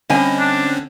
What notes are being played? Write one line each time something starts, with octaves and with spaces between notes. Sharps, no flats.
D3 G3 C4 C#4 D#5 G#5
D4